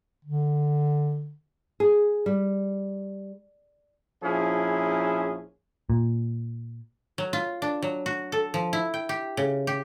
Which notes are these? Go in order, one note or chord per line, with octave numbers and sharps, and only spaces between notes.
D3
G#4
G3
A#1 F3 C#4 E4 G#4
A#2
F#3
F4
D4
F#3
F#4
A4
F3
E4
G5
G4
C#3
G4